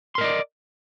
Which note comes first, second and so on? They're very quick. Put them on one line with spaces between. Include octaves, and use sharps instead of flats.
C6 A#4 D#5 D5